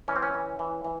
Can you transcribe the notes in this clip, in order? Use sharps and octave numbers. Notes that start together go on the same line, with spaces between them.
E3 C#4
C4
C#4
E3
E3
E3